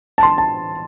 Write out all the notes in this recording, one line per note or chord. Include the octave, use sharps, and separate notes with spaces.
A5
C6
A5